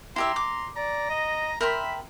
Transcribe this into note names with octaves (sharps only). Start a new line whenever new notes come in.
E4 G4 E5 A#5 C6
D6
D5 A#5
D#5
A#4 E5 G5 B5 C6